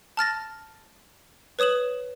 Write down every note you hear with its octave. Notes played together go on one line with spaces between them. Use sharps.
A5 F6 A6 A#6
B4 C#5 D#6 E7 F#7